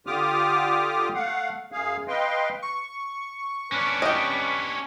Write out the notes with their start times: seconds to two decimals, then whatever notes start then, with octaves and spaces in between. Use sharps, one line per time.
0.07 D3 F4 G4 D6 D#6 F6
1.15 A3 F5 F#5
1.72 F#2 G#4 F5
2.08 B4 D#5 F5 G5 C6
2.62 C#6
3.72 C#4 D4 B4
4.02 G4 D#5